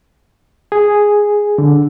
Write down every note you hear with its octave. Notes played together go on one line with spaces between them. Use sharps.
G#4
D3